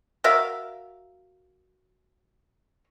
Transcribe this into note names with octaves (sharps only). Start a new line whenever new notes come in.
F#4 A#4 E5 F5